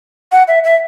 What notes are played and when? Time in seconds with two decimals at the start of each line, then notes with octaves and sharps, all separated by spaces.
0.32 F#5
0.48 E5
0.64 E5